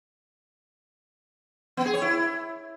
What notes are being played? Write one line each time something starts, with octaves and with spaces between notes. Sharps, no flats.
B3
G#4
C#5
E4